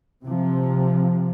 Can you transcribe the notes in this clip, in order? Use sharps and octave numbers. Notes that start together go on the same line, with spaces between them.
C3 F3